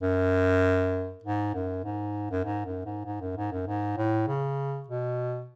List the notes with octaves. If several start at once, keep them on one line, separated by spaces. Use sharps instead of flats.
F#2
G#2
F#2
G#2
F#2
G#2
F#2
G#2
G#2
F#2
G#2
F#2
G#2
A2
C#3
B2